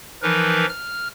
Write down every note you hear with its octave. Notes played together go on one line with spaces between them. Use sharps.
E3 F3 D#4 A#4 B4
F6